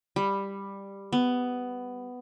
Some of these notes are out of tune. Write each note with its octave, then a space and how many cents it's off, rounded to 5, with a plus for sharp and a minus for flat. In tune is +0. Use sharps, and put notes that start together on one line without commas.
G3 +10
B3 +10